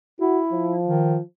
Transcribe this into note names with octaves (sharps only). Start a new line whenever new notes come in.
E4 F#4
F3
D#3